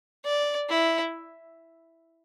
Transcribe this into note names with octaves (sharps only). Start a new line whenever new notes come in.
D5
E4